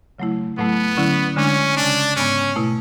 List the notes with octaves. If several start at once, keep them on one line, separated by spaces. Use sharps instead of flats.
C#3 F#3 A3 E4
A2 F#3 A3 B3 E4
D3 F#3 C#4 E4
D3 G#3 C#4 D4
C#3 G#3 C#4 D4
G#2 G#3 B3 C#4
B2 A3 E4